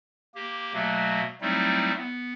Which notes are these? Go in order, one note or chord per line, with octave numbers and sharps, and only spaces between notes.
A#3 G4
B2 F#3 A3 A#3
F#3 G3 A3 C4 D#4 E4
B3